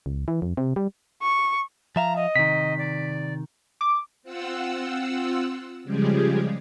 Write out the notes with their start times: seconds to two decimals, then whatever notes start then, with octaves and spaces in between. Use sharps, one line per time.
0.06 C#2
0.28 E3
0.42 F2
0.57 C3
0.76 G3
1.22 C#6
1.96 F3 E5 F5 A#5
2.16 D#5
2.36 C3 D#3 B6
2.78 D5
3.81 D6
4.23 C4 F4 F#5 E6
5.84 C#3 F3 G3 G#3 G4 G#4